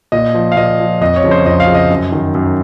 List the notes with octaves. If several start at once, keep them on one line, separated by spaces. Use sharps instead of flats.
A#2 D#5
F3
F5
A#2 D#5
F3
F2 D#5
C#5
C#3 F3
C5
F2 D#5
F5
C#3 F3
D#5
F#2
D#3
F#2